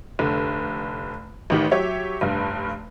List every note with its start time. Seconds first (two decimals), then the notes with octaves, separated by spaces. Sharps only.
0.19 F1 D3
1.50 A1 D#3 G4
1.71 F#3 G4 C#5 E5
2.21 F1 G2